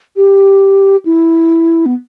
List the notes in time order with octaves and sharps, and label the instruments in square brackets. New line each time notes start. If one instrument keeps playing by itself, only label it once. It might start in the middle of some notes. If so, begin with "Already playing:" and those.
[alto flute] G4
E4
B3